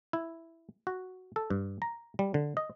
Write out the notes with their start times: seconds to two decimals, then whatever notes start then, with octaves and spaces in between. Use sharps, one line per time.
0.13 E4
0.87 F#4
1.36 A4
1.50 G2
1.82 A#5
2.19 G3
2.34 D3
2.57 D#5